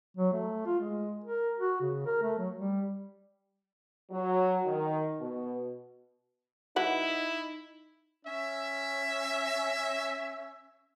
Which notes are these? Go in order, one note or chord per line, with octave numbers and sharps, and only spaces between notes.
F#3
A3
F4
G#3
A#4
F#4
C#3
A#4
A3
F#3
G3
F#3
D#3
B2
F#3 D#4 E4 B4 F#5
C#4 E5